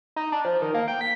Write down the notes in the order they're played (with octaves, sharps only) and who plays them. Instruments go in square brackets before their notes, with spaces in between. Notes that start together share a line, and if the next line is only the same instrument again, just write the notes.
[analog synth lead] D#4
D4
F3
D#3
A#3
G5
B6